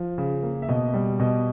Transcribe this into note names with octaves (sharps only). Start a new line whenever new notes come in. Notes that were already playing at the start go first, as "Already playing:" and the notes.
Already playing: F3
C#3
A#3
E5
B2 D#5
G3
B2 D#5